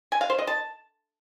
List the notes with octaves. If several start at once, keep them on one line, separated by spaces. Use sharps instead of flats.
G#5
F5
C5
D#5
A5